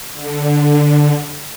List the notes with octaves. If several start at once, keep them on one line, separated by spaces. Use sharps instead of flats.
D3